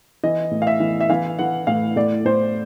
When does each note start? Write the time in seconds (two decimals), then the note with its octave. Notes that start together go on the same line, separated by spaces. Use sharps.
0.24 E3 D#5
0.51 A2
0.62 F5
0.67 E5
0.80 E3
1.01 E5
1.10 E3 F5
1.39 E3 F#5
1.67 A2 F5
1.96 A2 D5
2.25 A2 C5